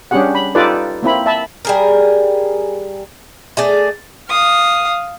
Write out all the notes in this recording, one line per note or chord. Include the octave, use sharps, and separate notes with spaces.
G3 C#4 D4 G4 G#4 F#5
B5
D#4 F4 G4 A4 B4 D5
A#3 C4 E4 B5
E5 A5 B5
G3 G#4 A#4
A3 G#4 D5
F5 D#6